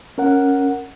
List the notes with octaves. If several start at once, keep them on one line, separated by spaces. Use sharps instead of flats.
C#4 A#4 F#5